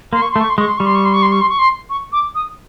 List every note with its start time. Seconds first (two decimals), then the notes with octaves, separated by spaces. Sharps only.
0.13 A#3 C6
0.22 C#6
0.32 A3 C6
0.41 C#6
0.50 C6
0.58 G#3 C#6
0.68 C6
0.78 G3 C#6
0.86 C6
0.95 C#6
1.05 C6
1.14 C#6
1.22 C6
1.32 C#6
1.41 C6
1.49 C#6
1.59 C6
1.90 C#6
2.12 D6
2.35 D#6